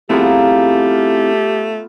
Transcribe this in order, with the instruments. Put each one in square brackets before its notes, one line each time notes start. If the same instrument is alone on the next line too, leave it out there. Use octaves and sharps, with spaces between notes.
[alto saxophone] A3 [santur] B3 F4 A#5 [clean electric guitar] C4 E4 G#4 [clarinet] G4